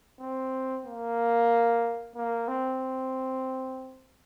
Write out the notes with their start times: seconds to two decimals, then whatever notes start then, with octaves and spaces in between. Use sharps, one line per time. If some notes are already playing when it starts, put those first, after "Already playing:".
0.21 C4
0.86 A#3
2.16 A#3
2.48 C4